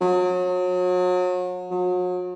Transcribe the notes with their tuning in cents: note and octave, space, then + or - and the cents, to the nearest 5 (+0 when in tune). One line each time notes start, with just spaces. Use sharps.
F#3 -35
F#3 -40